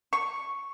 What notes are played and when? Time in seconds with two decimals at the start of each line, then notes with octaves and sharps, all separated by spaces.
0.13 C#6